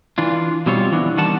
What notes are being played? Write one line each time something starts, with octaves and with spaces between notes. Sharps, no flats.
E3 D4 F4
B2 G3 C4 F4 C#5
E3 B3 D4
D#3 G3 F#5 A5